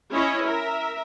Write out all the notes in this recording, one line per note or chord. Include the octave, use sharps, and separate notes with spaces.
C#4 E4 C#5 D#5
A#4 E5